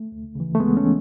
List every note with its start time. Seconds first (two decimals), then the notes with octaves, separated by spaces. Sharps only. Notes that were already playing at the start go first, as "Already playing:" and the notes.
Already playing: A3
0.12 D2
0.35 C#3 E3
0.55 A3
0.60 D2 G#3 B3
0.77 A3 C#4
0.85 E3